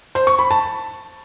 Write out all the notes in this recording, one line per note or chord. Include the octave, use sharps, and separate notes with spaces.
C5
C#6
B5
A5